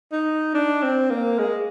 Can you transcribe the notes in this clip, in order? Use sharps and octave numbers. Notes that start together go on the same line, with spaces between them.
D#4
D4
C4
A#3
G#3